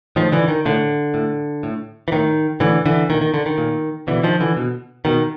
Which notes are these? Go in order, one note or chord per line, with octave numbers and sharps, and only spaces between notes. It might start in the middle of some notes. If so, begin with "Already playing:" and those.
A2 D#3 F3
D3 E3
D#3
A2 D3
A2
A2
E3
A2 D#3
A2 D3 E3
D3 E3
A#2 D#3
D#3
D3
D#3
A#2
B2 D3 E3
D#3 F3
D3 E3
B2
B2 D#3